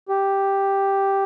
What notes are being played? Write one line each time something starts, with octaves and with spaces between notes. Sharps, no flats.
G4